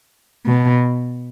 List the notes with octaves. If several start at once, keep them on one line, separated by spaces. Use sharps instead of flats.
B2